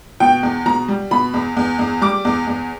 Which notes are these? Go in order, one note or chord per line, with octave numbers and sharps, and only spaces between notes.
B2 G5
E2
B2 A#5
G3
B2 B5
E2
E2
E2
G3 D6
E2
E2